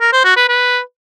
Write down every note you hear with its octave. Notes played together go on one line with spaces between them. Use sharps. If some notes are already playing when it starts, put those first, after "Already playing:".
A#4
C5
F#4
B4
B4